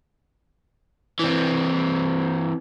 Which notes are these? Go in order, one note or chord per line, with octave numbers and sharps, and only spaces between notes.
E3 C4